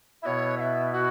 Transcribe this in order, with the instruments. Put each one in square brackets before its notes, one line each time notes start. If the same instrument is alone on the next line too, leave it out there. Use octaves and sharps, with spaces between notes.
[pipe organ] B2 B3 E4 [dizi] C#5 E5
[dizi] F#5
E5
F#4